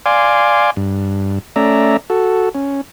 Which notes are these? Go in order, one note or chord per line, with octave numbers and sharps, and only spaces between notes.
D5 F5 G#5 C6 D6
G2
A3 C#4 D5 E5 A#5
F#4 A4
C#4